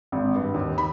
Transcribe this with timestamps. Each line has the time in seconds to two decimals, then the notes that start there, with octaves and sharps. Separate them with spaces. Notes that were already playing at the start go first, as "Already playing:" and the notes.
0.12 G#1
0.35 G2
0.54 D#2
0.78 B5